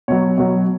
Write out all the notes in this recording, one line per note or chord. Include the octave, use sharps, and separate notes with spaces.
B2 F#3 C#5
B2 F#3